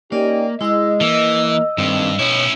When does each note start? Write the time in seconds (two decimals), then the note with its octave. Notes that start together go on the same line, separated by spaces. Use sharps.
0.12 A#3 C#4 D#4 G4 D5 D#5
0.61 G#3 E4 G#4 D#5 E6
1.01 E3 A#3 E6
1.78 G2 D#3 A#3 C4
2.19 B2 C#4 E4 C#5